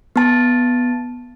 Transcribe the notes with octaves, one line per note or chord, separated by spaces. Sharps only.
B3 A5